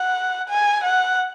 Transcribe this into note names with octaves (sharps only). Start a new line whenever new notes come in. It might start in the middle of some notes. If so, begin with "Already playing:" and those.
Already playing: F#5
G#5
F#5